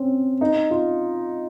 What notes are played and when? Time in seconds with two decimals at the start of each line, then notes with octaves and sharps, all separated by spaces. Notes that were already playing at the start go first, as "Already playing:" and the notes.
Already playing: C4 C#4
0.41 D#4
0.70 F4